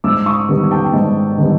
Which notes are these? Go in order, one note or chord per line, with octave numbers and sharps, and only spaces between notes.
G#2 D6 E6
C#6 D#6
D#3 G3 B3
G5 A5
G#2
D#3 G3 B3